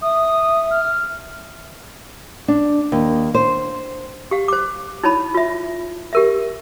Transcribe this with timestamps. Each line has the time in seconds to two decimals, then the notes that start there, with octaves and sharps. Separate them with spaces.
0.02 E5 D#6
0.71 F6
2.48 D4
2.92 D#2
3.34 C5
4.31 G4 F5
4.48 C5 D6
5.03 D#4 E4 C#5 A5 B5
5.34 F4 E5
6.13 G4 A#4 E5